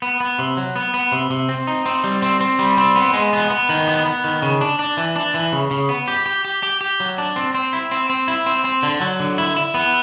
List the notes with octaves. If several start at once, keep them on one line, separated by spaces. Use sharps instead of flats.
B3
B3
C3
F#3
B3
B3
C3
C3
C4
D#4
C4
G3
C4
C4
G3
C4
B3
G#3
B3
B3
D#3
B3
B3
D#3
C#3
D4
D4
E3
D4
E3
C#3
C#3
B3
G4
G4
G4
G4
G4
F#3
D4
C4
C4
E4
C4
C4
E4
C4
C4
D3
F#3
D3
E4
E4
B3